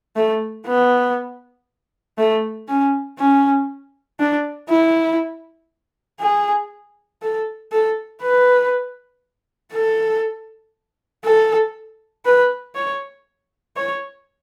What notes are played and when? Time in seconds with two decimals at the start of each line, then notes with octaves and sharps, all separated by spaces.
0.16 A3
0.67 B3
2.18 A3
2.68 C#4
3.19 C#4
4.20 D4
4.70 E4
6.20 G#4
7.22 A4
7.72 A4
8.22 B4
9.73 A4
11.25 A4
12.26 B4
12.75 C#5
13.77 C#5